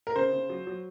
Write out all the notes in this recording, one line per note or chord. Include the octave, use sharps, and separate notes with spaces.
A#4
C#3 C5
C#3
F#3
F#3